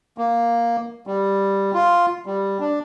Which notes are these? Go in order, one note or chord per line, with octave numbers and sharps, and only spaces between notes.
A#3
G3
F4
G3
D4